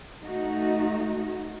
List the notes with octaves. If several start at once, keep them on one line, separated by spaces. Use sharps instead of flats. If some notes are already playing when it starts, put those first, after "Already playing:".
A3 D#4 F#4